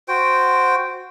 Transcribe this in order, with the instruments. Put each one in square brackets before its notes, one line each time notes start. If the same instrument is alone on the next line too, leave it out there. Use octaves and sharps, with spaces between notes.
[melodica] F#4 C5 G5